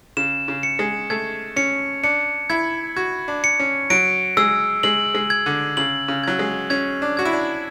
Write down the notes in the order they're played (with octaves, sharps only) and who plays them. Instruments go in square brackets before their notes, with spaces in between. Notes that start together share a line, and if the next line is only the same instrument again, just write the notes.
[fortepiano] C#3 [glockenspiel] E7
[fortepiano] C#3
[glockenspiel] C#7
[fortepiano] G#3
[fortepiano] A3 [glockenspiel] G#6
[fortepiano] C#4 [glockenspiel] C#7
[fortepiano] D4 [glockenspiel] C#7
[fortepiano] E4 [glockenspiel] G#6
[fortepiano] F#4 [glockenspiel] G#6
[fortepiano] D4
[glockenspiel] C#7
[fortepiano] C#4
[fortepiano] F#3 [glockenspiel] D7
[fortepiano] G#3 [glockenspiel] E6
[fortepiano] G#3 [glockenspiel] F#7
[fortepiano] G#3
[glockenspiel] G#6
[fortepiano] D3
[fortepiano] C#3 [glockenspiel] F#7
[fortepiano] C#3
[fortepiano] F#3 [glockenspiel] G#6
[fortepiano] G#3
[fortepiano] C#4 [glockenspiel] G#6
[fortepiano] D4
[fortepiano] F#4 [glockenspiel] G#6
[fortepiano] E4
D4